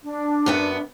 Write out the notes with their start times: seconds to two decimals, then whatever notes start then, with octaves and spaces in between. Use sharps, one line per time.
0.03 D4
0.46 F#2 B3 F#5